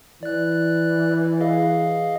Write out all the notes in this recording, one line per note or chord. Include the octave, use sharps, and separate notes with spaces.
E3 D5 F#6
G#4 D#5 F5